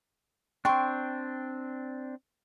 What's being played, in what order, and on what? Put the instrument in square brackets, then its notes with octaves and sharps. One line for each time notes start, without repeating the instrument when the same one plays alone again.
[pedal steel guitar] C4 D4 [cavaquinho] G5 C6 C#6